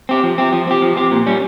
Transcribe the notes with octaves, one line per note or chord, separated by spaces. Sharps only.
C4 G4
F3
C4 G4
F3
C4 G4
F3
C4 G4
A#2
G3 C#4